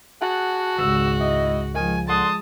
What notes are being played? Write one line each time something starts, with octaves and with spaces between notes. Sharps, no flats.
F#4 G#4 F#5 A5
G#1 C#2 G2 G#3 E6
E4 D#5
D#3 F3 G#3 G#5
D3 G#3 F#5 A5 C6 D#6